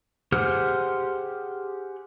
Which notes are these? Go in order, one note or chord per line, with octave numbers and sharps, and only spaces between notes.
G4 G#4 C5 F#5 F6